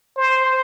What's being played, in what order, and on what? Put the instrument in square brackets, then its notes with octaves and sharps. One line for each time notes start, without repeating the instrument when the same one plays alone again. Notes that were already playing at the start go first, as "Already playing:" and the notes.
[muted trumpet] C5